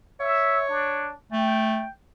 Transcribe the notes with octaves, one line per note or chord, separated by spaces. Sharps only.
C#5 E5
D4
A3 G5